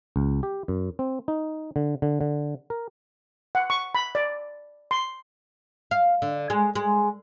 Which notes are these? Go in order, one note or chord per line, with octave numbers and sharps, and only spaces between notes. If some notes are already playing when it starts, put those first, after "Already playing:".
C#2
G4
F#2
C4
D#4
D3
D3
D3
A#4
F#5
C#6
B5
D5
C6
F5
D3
G#3
G#3